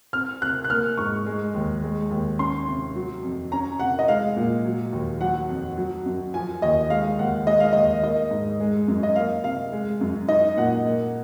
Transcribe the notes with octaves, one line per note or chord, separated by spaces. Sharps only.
C4 F6
C3 F#6
F#6
A#3 F6
G#2 C#6
G#3
D#2
G#3
D#2
C#4 C6
C3
F#3
F2
C#4 A#5
C3 F#5
D#5
G#3 F5
A#2
F#3
D#2
F#3 F#5
F2
F#3
F#2
F3 G#5
D#2 D#5
G#3 F5
D#2 F#5
G#3 D#5
F5
D#2 D#5
A#3 D#5
G#2
G#3
F#2
D#5
A#3 F5
C3 F5
G#3
F#2
D#4 D#5
A#2 F#5
A#3